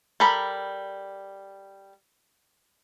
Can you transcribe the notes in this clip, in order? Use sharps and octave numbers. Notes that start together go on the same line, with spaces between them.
G3 A4 A#4 B5